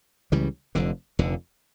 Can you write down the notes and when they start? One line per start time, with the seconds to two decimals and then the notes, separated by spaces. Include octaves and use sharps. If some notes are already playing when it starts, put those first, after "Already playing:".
0.32 C#2 C#3 E3 G3
0.75 F1 F2 D3
1.19 F1 F2 D3